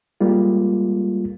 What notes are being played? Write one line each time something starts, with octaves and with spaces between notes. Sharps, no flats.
G3 G#3 A#3 F4